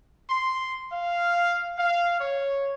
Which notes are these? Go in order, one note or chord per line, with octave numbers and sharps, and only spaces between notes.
C6
F5
F5
C#5